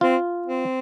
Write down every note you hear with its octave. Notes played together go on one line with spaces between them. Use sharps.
C4 F4
C4